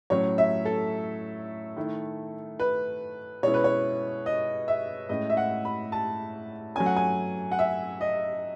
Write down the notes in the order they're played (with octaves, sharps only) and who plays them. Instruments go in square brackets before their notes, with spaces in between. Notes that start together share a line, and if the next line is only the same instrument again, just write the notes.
[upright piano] A2 F#3 C#4 C#5
E5
A4
D#3 A3 E4
B4
B2 G#3 C#4 E4 C#5
B4
C#5
D#5
E5
A2 G#3 C#4 E4 D#5
E5
F#5
B5
A5
F#3 A3 C#4 G#5
F#5
G#5
F#5
E5
D#5